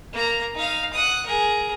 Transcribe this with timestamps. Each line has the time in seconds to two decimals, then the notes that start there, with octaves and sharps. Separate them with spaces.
0.13 A#3 A#5
0.55 D#4 F5
0.93 F#5 D#6
1.26 G#4 A#4